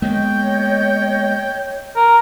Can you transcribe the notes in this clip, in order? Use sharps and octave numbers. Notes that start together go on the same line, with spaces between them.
G#3 A#3 B3 C#5 D#5 G5
A#4 F#5